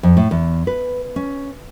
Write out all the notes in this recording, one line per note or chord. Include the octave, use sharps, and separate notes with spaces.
F2
A2
E2
B4
C#4